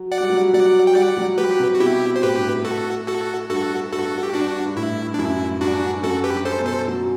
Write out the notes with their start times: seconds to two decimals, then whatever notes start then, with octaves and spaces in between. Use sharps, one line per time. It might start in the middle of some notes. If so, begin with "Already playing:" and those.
Already playing: F#3
0.12 D5 F#5
0.20 G3
0.30 F#3
0.39 G3
0.53 F#3 D5 F#5
0.87 G5
0.96 G3 D5 F#5
1.17 F#3
1.38 F#3 G4 B4
1.59 C3
1.75 F#4
1.80 B2 E4 G4
2.16 C5
2.22 A2 G4 B4
2.34 G2
2.44 A2
2.65 F#4 A4
3.08 F#4 A4
3.49 G2 F#4 A4
3.92 G2 F#4 A4
4.23 G4
4.34 G2 D4 F#4
4.65 G2
4.76 A2 E4
5.14 D4
5.19 F#2 E4
5.61 G2 D4 F#4
6.03 F#2 F#4 A4
6.24 G4 B4
6.31 G2
6.45 A4 C5
6.59 B2
6.66 A4 C5
6.88 F#3